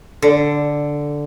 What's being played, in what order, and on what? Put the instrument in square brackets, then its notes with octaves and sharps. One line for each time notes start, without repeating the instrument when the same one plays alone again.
[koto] D3